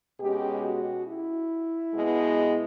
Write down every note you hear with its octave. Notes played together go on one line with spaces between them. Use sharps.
B2 G#3 C#4 G4
F#4
E4
B2 G#3 B3